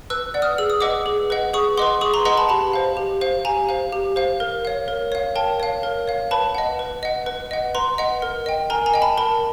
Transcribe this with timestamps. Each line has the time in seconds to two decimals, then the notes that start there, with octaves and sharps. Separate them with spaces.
0.10 B4 E6 F#6
0.34 D5 F#5
0.42 D#6 F6
0.58 G#4 E6
0.70 D#6
0.80 B4 D#5 F#5 D6 E6
1.06 G#4
1.30 B4 D#5 F#5
1.54 G#4 C#6 D#6
1.77 B4 D#5 F#5 C6 D6
2.01 G#4 C#6 D#6
2.14 A#5 C6
2.25 B4 D#5 F#5 A#5 C6
2.37 A5 B5
2.49 G4 A5 B5
2.73 C5 F5
2.97 G4
3.21 C5 F5
3.45 G4 G#5 A#5
3.69 C5 F5
3.92 G4
4.16 C5 F5
4.40 A#4
4.65 C#5 F5
4.88 A#4
5.12 C#5 F5
5.36 A#4 G5 A5
5.60 C#5 F5
5.83 A#4
6.08 C#5 F5
6.31 B4 A5 B5
6.55 D#5 F#5
6.79 B4
7.03 D#5 F#5
7.26 B4
7.51 D#5 F#5
7.75 B4 A#5 C6
7.98 D#5 F#5
8.22 A#4
8.46 D#5 G5
8.70 A#4 G#5 A#5
8.86 G#5 A#5
8.94 D#5 G5
9.02 A5 B5
9.17 A#4 A5 B5